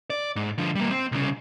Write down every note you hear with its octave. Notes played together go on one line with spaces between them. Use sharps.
D5
G#2
D3 F3
G3 A#3
C4
C2 C#3